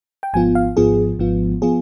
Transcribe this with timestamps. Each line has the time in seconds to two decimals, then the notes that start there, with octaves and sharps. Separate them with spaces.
0.23 G5
0.34 G#1 G#2 F3 B3 F4 G#5
0.55 F5
0.77 G#1 G#2 F3 B3 F4 G#4
1.19 G#1 G#2 F3 B3 F4
1.62 F3 B3 F4 G#4